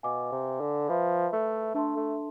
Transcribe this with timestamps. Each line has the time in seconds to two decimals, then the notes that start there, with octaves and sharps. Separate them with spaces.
0.03 B2 B4 F5 G#5 D6
0.32 C3
0.61 D3
0.89 F3 B4 E5 B5
1.33 A3
1.74 A3 D4 A4 E5 A5 C6
1.96 A3